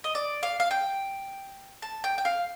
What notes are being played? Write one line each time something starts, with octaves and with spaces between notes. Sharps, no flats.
D#5
D5
F5
F5
G5
A5
G5
G5
F5